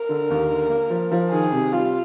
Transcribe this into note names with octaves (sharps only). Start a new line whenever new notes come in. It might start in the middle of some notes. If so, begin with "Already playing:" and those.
Already playing: A#4
D3
D#2
D3
A#3
F3
F3
D#3 G#4
C3
G3 F4